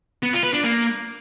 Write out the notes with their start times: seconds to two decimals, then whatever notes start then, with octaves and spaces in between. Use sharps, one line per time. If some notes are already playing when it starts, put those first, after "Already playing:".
0.23 B3
0.33 F4
0.43 B4
0.53 D4
0.63 A#3